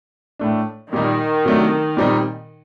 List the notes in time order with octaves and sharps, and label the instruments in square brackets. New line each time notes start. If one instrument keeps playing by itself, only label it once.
[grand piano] A2 A3 D4
[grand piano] A#2 G3 A#3 D#4 [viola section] D#3
[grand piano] C3 F#3 A3 D4
A#2 G3 C4 D#4